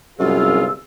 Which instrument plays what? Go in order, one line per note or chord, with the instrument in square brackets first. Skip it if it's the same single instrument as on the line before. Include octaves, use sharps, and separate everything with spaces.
[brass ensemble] G1 C2 F4 [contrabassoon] F#2 [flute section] G#4 E6